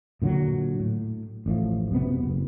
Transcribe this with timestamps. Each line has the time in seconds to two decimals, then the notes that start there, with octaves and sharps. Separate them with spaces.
0.22 A#2 D3 F3 F#3
0.80 A2
1.46 A1 A2 F3
1.91 F#2 C3 B3
2.23 F#1